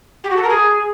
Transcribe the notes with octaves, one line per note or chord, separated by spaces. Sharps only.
G4
F#4
A4
A#4
G#4